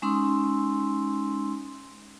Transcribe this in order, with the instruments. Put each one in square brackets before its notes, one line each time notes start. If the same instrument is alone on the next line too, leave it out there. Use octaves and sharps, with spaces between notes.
[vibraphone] G#3 C#4 D#4 C6 E6